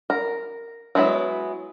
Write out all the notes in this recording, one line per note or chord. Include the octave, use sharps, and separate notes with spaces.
A#4
F#3 G#3 B3 E4